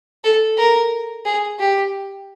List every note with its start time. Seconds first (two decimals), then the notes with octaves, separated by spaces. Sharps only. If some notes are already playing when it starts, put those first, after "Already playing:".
0.24 A4
0.57 A#4
1.25 G#4
1.59 G4